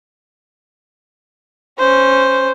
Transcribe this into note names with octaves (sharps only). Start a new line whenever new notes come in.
C#4 C5